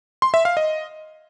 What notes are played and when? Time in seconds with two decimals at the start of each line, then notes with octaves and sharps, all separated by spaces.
0.22 C6
0.34 E5
0.45 F5
0.57 D#5